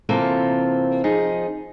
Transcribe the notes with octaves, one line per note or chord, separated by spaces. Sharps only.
C3 E3 A#3 C4 F4 A4
F3 D#4 G#4